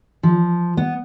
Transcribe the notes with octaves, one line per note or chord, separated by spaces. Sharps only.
F3
B3